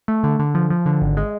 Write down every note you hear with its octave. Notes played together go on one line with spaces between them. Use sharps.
A3
D3
D3
F3
F3
D3
G#1
G#3